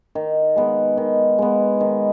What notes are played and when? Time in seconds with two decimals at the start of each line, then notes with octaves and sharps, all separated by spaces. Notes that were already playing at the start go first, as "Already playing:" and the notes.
0.15 D#3
0.56 G#3 B3
0.97 D#3
1.38 G#3 B3
1.80 D#3